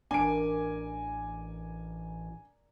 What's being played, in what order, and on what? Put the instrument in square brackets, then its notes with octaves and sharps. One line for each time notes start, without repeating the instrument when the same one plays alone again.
[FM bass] A1 [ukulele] D4 [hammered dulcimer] A#4 D5 [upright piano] G#5 D7